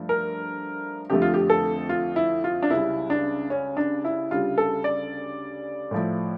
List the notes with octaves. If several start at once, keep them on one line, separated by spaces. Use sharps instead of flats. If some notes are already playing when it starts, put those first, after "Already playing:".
Already playing: G2 F3 A3
A#4
F2 D3 F3 A3 G4
F4
G4
A4
F4
E4
F4
D4
C#2 C#3 G3 E4
D4
C#4
D4
E4
D2 C#3 G3 F4
A4
D5
A2 F3 A3